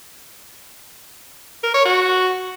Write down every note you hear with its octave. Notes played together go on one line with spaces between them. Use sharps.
A#4
C#5
F#4